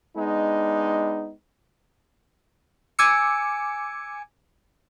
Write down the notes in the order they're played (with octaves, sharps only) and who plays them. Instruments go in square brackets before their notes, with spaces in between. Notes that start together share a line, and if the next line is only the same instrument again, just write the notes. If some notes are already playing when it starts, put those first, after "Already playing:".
[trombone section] G#3 B3 D4 D#4
[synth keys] G#5 D6 E6 C#7